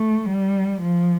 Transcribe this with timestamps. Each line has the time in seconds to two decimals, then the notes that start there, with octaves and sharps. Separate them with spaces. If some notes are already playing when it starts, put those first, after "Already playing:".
Already playing: A3
0.29 G3
0.82 F3